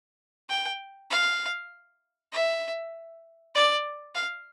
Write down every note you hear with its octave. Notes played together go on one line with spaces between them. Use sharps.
G5
F5
E5
D5
F5